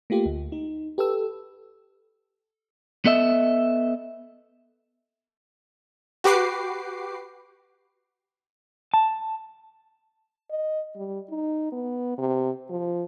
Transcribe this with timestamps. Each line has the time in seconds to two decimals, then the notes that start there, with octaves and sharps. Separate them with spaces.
0.10 A3 A#3 F4 G4
0.26 D2
0.52 D#4
0.98 G4 A4 B4 E6
3.05 B3 A4 D#5 E5
6.24 F#4 G4 B4 D6 C7
8.94 A5
10.51 D#5
10.96 G3
11.30 D#4
11.72 B3
12.18 C3
12.70 F3